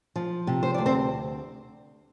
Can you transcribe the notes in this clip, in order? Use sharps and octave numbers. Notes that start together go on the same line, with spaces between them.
F3
C3
C5
D2 D5
C4 C5